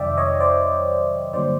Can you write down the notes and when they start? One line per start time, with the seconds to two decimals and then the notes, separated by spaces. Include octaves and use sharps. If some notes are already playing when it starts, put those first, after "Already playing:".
Already playing: F2 C3 D#3 F#3 D5 E5 G5
0.17 C#5 D#5
0.40 C5 D5
1.33 G2 D3 F#3 A#3 C5 D5